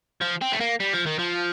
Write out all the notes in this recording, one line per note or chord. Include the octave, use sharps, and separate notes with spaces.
F3
C4
A3
A#3
G3
F3
D#3
F3